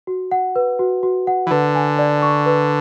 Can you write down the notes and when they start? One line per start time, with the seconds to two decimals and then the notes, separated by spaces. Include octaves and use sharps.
0.07 F#4
0.31 F#5
0.56 B4
0.79 F#4
1.03 F#4
1.27 F#5
1.47 E3
1.51 D3 B4
1.75 G#5
1.99 D5
2.22 C#6
2.46 B4